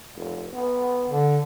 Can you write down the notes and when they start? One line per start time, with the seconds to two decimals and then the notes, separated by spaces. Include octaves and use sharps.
0.16 F1
0.54 B3
1.09 D3